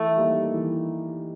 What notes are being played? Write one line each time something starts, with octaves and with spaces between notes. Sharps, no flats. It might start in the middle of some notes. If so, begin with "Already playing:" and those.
Already playing: E3 A3
G3 A#3 D#4
E3